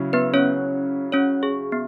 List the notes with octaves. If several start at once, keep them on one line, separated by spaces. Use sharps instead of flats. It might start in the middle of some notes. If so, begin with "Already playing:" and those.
Already playing: C#3 F#3 C#4 E4
B3 B4
C#4 C#5
C#4 C#5
G#4
B3